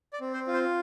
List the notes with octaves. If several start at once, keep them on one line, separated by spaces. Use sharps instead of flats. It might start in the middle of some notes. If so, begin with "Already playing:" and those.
D5
C4
C5
F4
C5